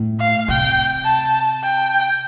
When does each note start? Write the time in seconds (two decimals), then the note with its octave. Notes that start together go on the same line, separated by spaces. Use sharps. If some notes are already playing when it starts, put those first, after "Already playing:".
Already playing: A2
0.20 F5
0.48 C3 G5
1.05 A5
1.63 G5